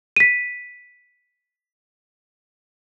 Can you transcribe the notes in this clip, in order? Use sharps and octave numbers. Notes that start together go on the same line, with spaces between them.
B6 D#7